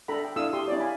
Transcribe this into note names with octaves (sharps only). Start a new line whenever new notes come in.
D4 A4 G5 A#5 B5
G5
D4 E4 A4 F5 D#6 E6
G4 C6 D#6
C#4 E4 C#5 D5
F5 G#5 B5